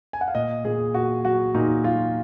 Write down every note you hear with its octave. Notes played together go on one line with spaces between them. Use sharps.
G#5
F#5
F5
A#2 D#5
A#2 G#4
A#2 F#4
F#3 F#4
A#2 D#4
F#3 F4